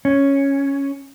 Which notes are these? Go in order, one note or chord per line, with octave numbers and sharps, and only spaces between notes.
C#4